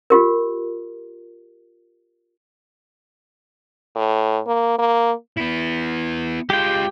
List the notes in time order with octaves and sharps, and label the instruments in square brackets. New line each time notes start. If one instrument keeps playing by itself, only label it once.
[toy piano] F4 G4 A#4
[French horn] A2
A#3
A#3
[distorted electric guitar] B3 E4
[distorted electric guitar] G#3 F4 [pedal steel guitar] G4 G5